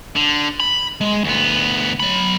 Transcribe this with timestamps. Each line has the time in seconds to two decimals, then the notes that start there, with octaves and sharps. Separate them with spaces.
0.16 D3
0.60 B5
1.01 G#3
1.24 D2 B3
2.00 F#3 B5